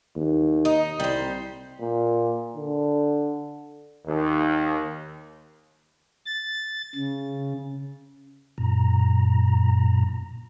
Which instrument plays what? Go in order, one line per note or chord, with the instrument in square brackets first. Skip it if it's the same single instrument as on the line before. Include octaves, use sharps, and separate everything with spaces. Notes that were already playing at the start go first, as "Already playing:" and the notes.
[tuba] D#2
[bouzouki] D#4
[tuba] C2 [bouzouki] G3 C5
[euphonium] A#2
D3
[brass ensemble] D#2
[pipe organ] A6
C#3
[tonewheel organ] F#2 A#2 A#5